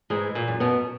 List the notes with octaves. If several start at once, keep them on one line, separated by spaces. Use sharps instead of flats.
G#2 E3 G#3
A#2 A#3
F#2
B2 B3